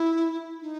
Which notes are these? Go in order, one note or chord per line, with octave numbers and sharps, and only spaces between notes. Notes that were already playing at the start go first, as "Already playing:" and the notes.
Already playing: E4
D#4